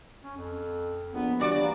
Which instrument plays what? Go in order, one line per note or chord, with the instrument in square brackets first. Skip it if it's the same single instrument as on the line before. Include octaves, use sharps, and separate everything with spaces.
[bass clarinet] C#4
F2
[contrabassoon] A#1 [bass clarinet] B3
[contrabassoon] G2 [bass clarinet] E3 [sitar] F#4 D5
[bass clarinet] A#3